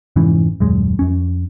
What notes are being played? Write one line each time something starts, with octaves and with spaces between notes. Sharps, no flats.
F1 G#2 E3 C#4
D#1 F#2 G#3
F2 C#4